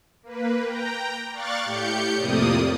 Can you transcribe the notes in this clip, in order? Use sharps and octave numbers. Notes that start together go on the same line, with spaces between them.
A#3 B4
G5 A#5
D5 F5 C#6 F#6 A6
A2 G4 G6 C#7
F2 A2 C3 A#3 D5 D#6